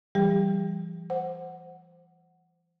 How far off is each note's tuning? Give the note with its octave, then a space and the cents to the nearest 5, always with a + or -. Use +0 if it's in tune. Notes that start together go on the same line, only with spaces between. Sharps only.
E3 +40 G3 +0 G4 +35
C5 +0 F#5 +0